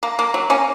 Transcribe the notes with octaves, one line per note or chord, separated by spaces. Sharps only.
A#3
A#3
F#3
A#3 C#4